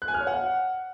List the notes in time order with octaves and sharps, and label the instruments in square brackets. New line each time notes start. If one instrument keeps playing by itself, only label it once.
[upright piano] F#6
G#5
F6
C#5
F#5